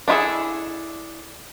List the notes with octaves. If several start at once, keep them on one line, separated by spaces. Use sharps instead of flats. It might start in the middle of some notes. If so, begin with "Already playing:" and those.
D4 E4 F4 G#4 A4